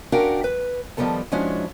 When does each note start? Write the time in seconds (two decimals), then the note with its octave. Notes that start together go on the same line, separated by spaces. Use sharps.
0.12 C#4 D4 F#4 A#4 F5 G5
0.44 B4
0.97 D#3 F3 G3 B3 A4 A5
1.32 F3 G#3 C#4 D4 E4 F#4